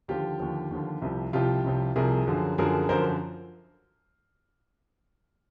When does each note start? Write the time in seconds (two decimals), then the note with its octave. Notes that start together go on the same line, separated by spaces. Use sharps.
0.08 D#2 D3 F3 F4 G4
0.40 D#2 D3 F3
0.71 D#2 D3 F3
1.02 C2 C3 F3
1.33 C2 C3 F3 F4 G4
1.64 C2 C3 F3
1.96 C2 C3 F3 G#4 A#4
2.27 F#2 D3 F3
2.58 F#2 D3 F3 G#4 A#4
2.89 F#2 D3 F3 A#4 C5